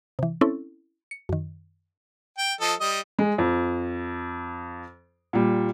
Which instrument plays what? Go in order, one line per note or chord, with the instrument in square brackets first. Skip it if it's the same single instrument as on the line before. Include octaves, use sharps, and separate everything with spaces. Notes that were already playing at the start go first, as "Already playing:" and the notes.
[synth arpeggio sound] C3 E3
C4 C#4 E4 A4
C#7
F#2 D#3
[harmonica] G5
F3 A4 D#5
G3 D#5
[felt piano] G#3
F2
A#2 G3